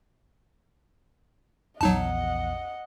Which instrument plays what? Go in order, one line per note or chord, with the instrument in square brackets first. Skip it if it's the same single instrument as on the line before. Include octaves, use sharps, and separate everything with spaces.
[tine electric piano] A#1 E2 [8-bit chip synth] F#3 D#4 A5 [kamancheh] D#5 F#5